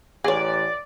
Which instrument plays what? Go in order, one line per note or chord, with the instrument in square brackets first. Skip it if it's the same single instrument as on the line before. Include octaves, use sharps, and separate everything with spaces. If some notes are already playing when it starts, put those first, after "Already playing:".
[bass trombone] A1 [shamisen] G#4 C#5 [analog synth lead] D5